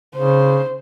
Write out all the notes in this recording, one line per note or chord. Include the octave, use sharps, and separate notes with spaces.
C#3 C5